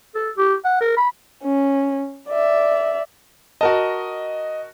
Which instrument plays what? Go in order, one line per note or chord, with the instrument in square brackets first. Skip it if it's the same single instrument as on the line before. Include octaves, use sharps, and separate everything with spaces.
[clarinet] A4
G4
F#5
A#4
B5
[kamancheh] C#4
D5 E5
[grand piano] F#4 A#4 A5 [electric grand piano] D#5